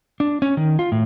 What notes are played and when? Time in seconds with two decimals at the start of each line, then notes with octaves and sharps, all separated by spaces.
0.20 D4
0.42 C#4
0.57 D#3
0.79 F4
0.92 A2